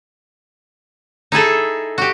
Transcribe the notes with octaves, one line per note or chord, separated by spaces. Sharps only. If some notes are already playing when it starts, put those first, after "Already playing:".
D#4 E4 G#4 A4
F#4 G4